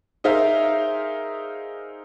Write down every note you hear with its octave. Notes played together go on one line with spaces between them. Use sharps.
D#4 G#4 A#4 C5 E5 F5